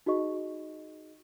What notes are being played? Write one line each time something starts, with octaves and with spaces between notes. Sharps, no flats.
D#4 F#4 G#4 D#5 C#6